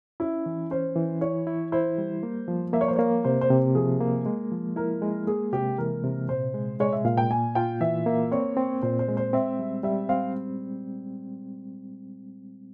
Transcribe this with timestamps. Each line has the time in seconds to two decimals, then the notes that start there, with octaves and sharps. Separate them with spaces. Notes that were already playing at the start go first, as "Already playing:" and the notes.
0.20 C#4 E4
0.46 E3
0.71 C#4 C5
0.96 E3
1.21 E4 C#5
1.47 E4
1.72 E4 C5
1.98 G3
2.23 A#3
2.48 F3
2.73 A#3 E5
2.81 C#5
2.88 C5
2.96 A#3 C#5
3.25 C3 C5
3.41 C5
3.50 C3
3.75 F3 G#4
4.00 A#3
4.26 G#3
4.52 F3
4.76 E4 A#4
5.02 G#3
5.27 A#3 G#4
5.52 C3 G4
5.78 E3 A#4
6.04 C3
6.28 A#2 C5
6.54 G#3
6.80 G#3 C#5
6.93 E5
7.05 A#2 F5
7.17 G5
7.30 A#3 G#5
7.55 F4 G5
7.81 E3 E5
8.06 A#3
8.32 C4 C#5
8.57 C4
8.82 A#2 C5
8.99 C5
9.08 G#3
9.17 C5
9.33 C4 E5
9.59 G3
9.84 G3 E5
10.09 C4 F5